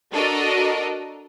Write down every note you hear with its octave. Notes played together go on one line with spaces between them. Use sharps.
D4 F#4 A4 A#4 D#5